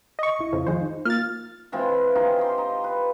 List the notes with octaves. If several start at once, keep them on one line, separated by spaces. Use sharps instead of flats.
D#5 C#6
C2 E4
F2 C#3 F3
D#3 F3 G#3 F4 C5
D#4
A#3 F4 F6 A6
E3 G#3 C4 F4
D#4 F4 G4 G#4
G4 C6
D#4
B4